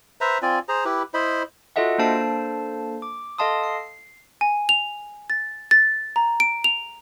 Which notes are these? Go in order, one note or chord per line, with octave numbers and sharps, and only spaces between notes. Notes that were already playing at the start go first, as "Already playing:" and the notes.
B4 C5 E5 A#5
C4 F4 D5 G#5
G#4 C5 A#5
E4 G4 B4
E4 C5 D#5 B5
F4 F#4 A4 D#5 E5 F#5
A#3 D4 A4 C5 A5 C7
D6
A4 D#5 F5 A5 C6 D#6
C7
G#5
F7
A6
A6
A#5
D7
F7